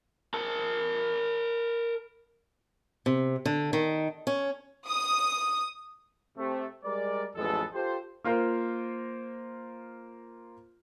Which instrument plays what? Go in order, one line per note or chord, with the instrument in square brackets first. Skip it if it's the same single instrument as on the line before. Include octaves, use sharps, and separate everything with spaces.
[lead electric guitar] A#4 A5
[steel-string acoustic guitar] C3
D3
D#3
C#4
[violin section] D#6
[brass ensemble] C3 A3
G3 G#3 A#4 D5
A1 F2 G#3 B3 A4
F4 G4 A4 C5
[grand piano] A#3 F4 A#4 C5